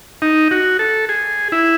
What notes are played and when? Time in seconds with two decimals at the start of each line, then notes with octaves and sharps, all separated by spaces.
0.22 D#4
0.51 F#4
0.79 A4
1.09 G#4
1.52 E4